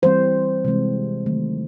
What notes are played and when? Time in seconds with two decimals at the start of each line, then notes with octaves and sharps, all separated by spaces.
0.02 E3 G3 C4 C5
0.65 C3 E3 G#3 C4
1.26 D#3 F#3 A3